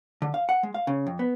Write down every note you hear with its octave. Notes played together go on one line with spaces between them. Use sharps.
D3
F5
F#5
G#3
F5
C#3
F2
B3